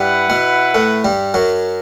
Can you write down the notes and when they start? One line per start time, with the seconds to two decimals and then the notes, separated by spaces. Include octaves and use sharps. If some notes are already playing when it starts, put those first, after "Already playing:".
Already playing: G2 G3 E4 B4 F#5
0.30 B2 B3
0.75 A2 A3
1.04 G2 G3
1.34 F#2 F#3